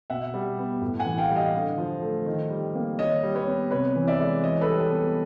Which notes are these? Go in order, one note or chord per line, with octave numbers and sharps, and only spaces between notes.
B2 E5 F#5
G3
B3
A2
F#5 G#5
E3
F5 G5
G3
D#5 F5
D3
F3
A3
D#3
G3
A#3
D#3 C#5 D#5
G3
B4 C#5
B3
C3 B4 C#5
E3
D5 E5
G#3
E3 C#5 D#5
A4 B4
G3
A4
B3